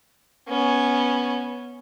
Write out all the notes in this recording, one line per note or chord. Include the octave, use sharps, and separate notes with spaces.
B3 C#4